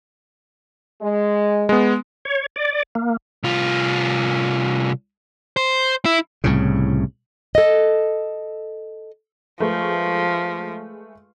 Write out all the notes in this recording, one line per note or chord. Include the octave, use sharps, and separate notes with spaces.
G#3
G#3 B3
C#5
D5
A#3
C2 F4
C5
E4
C2 A2 C#3
A4 D#5
F3 G#3 A3 B4